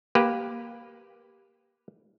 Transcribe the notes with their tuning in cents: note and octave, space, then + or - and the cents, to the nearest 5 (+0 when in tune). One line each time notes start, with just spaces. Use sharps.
A#3 +10 G4 +0 B4 +0